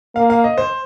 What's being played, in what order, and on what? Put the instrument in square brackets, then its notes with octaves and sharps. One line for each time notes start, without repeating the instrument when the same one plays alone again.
[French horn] A#3 [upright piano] F5
[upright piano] F5
D#5
C5